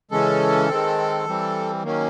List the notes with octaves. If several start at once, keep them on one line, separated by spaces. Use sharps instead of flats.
C#3 E3 G#3 C#4 A4
D#3 G#3 C4
E3 G3 C4
D#3 F#3 A#3 C#4